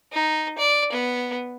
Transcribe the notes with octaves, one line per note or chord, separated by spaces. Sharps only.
D#4
D5
B3